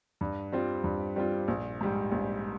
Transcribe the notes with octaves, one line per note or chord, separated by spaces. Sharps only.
G2
G3 C4 F4
G2
G3 C4 F4
A#1
G#2 G3
A#1